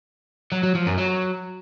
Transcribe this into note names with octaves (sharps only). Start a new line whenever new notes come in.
F#3
F#3
F3
F#2
F#3